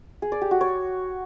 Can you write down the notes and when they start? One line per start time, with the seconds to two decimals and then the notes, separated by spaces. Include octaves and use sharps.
0.22 G#4
0.32 D5
0.41 G4
0.51 F#4
0.61 C#5